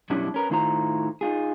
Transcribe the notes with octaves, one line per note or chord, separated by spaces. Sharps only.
F#2 B2 G3 C#4 D4 E4
C#4 A#4 B4
A2 D#3 E4 F4 C5 A#5
D#4 F4 G#4